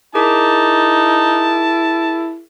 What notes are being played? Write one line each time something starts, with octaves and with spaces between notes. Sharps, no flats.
D#4 E4 G#4 A#4 A5 D6